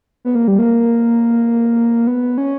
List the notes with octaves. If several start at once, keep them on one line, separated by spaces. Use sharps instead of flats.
B3
A#3
G3
A#3
B3
C#4